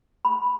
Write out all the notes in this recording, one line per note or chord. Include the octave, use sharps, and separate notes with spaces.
B5